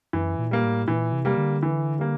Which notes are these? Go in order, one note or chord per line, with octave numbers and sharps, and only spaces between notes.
F#2 E3
A#2
G3 A#3
A2
A#2 E3
C3
G3 A#3
D3
E3
G3 A#3